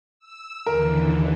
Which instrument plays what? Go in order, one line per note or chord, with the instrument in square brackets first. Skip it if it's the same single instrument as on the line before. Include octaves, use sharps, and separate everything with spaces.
[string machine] E6
[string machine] D#2 D3 E3 [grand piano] A#4